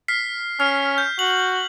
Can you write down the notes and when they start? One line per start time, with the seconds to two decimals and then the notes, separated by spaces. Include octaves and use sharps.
0.08 F6 B6 C7
0.60 C#4 F6
0.98 G6
1.19 F#4 F#7